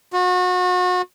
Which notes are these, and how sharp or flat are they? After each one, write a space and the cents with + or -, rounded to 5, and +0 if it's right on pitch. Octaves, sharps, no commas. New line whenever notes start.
F#4 -35